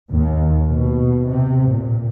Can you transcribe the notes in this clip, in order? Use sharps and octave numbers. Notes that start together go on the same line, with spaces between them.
D#2
B2
C3
A#2